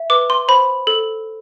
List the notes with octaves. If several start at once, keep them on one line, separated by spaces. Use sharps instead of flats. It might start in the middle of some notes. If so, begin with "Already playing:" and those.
Already playing: E5
B4 D6
C6
C5 B5
A4